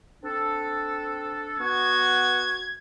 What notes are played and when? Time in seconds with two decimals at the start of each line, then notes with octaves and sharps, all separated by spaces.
0.23 C4 D4 A4
1.59 B3 F#4 G#6